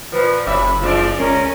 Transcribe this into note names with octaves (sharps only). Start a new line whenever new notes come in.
A#2 F3 B4
F#1 C3 C#4 E5 B5
F3 G#3 D4 F4
C#2 C#4 A#4